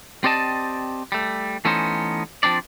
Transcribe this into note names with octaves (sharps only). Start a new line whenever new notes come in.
C4 G4 D5 D#5 A5
G3 A3
E3 A3 B3 C#4 D#4 C5
F3 C4 D4 D5